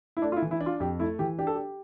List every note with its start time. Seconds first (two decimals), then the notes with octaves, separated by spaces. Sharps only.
0.17 E4
0.22 A3 D4
0.32 F4
0.36 E4
0.42 E3
0.51 E4
0.61 D4
0.66 F4
0.80 F2 G4
0.99 A3 E4
1.19 E3 G4
1.38 D4 G4
1.47 A4
1.55 G4